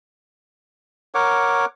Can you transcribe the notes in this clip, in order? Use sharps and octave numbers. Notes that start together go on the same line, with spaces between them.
A#4 C#5 F#5 D6